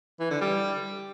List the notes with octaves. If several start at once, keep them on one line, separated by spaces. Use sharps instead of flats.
E3
D3
G3